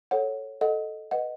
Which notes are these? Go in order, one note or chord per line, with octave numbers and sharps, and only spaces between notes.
A4 C#5 F#5
A4 D#5 F#5
B4 D#5 F#5